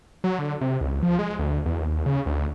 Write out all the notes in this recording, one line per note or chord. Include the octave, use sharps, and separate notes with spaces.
F#3
D3
C3
C#2
F3
G#3
D2
E2
D#2
C#3
D2